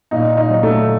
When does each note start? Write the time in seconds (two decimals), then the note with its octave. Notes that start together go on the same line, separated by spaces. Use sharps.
0.11 A#2 D#4
0.37 D#4
0.50 F#3
0.63 A3